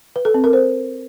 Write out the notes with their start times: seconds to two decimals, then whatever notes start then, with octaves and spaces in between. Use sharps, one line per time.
0.16 B4
0.25 A4
0.34 C4
0.44 A#4
0.53 C5